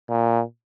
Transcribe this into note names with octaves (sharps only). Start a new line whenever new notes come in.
A#2